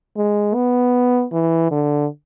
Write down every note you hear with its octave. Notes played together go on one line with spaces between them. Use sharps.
G#3
B3
E3
D3